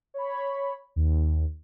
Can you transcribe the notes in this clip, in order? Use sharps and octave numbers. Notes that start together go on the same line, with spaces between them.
C#5 B5
D#2